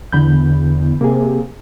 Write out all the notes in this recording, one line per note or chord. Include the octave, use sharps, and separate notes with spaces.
E2 D3 B5 G6
C3 A#3 G#4